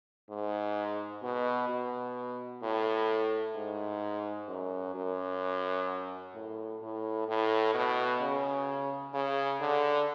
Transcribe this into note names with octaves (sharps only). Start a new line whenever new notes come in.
G#2
B2
B2
A2
G#2
F#2
F#2
A2
A2
A2
B2
C#3
C#3
D3